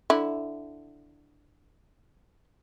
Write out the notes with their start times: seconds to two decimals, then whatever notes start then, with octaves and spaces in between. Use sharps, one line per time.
0.10 D3 E4